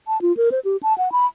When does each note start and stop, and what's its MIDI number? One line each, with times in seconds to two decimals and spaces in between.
0.08 0.21 81
0.22 0.35 65
0.37 0.49 70
0.52 0.60 72
0.65 0.77 67
0.83 0.96 81
0.98 1.12 78
1.12 1.26 83